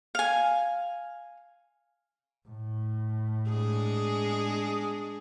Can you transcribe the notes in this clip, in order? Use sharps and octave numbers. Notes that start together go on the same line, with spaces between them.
F5 G#5
A2
G#3 D4 G#4